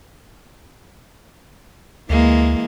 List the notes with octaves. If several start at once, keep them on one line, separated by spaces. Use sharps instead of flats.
D2 E3 G#3 A#3